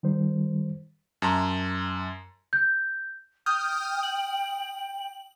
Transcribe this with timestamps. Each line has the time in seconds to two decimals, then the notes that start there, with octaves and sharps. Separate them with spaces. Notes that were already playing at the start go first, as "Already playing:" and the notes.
0.03 D#3 G3 C5
1.22 F#2 A5 A#5 C6
2.53 G6
3.46 G5 D#6 F6 G6
4.03 F#7